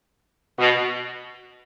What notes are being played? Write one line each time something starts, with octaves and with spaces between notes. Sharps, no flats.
B2